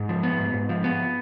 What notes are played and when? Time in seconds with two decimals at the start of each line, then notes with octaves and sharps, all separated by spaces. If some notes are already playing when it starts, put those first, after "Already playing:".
Already playing: G#2
0.09 F3
0.23 B3
0.39 G#2
0.54 G#2
0.69 F3
0.84 B3